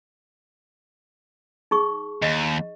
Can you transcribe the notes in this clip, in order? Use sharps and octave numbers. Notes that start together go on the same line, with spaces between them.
D#4 G#4 C#6
D#2 D#5